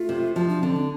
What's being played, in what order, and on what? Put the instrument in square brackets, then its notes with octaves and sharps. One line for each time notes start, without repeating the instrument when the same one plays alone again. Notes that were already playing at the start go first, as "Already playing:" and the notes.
Already playing: [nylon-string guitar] A3 [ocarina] F4
[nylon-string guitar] C3
[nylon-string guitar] F3 [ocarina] F4
[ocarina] D4
[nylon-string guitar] D3 [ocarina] C4
[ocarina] D4